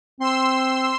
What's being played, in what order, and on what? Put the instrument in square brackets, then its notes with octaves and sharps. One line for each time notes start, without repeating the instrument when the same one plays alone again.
[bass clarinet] C4 [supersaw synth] C6 E6